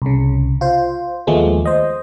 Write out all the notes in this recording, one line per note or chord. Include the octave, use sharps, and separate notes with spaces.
C2 C#3
F4 C5
D#2 F3 G#3 A3 B3
C5 D#5